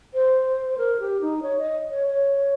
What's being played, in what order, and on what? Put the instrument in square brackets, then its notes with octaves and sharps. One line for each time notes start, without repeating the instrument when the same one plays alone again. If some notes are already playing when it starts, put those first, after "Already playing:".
[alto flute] C5
A#4
G4
D#4
C#5
D#5
C#5
C#5